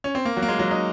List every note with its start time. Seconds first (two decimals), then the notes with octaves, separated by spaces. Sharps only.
0.04 C#4
0.15 C4
0.25 A#3
0.37 F#3
0.42 A#3
0.48 G#3
0.59 F#3
0.71 D#4